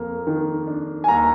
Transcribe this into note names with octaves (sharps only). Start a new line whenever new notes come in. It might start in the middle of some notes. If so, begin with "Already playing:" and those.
Already playing: F2 A#3
D#3
D4
G#5
D#2 A#5